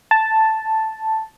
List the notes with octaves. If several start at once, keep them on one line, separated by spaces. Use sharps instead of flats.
A5